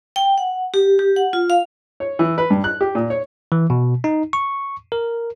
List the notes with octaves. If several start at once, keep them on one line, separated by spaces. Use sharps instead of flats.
G5
F#5
G4
G4
F#5
F4
F5
C#5
E3
B4
G2
F#6
G4
A#2
C#5
E3
B2
D#4
C#6
A#4